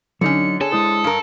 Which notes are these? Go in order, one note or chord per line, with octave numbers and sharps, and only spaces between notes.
D3 F#3 C#4 D#4 C#7
G#4 A4 C#5
G#3 E4 C5 D#6
G2 A#4